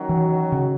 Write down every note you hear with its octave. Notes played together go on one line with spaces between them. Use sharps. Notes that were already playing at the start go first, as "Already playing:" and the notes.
Already playing: D#3 F#3 C#4 F#4
E3
C#3